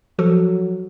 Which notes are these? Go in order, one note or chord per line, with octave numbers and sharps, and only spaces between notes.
F3 F#3 F#4 A4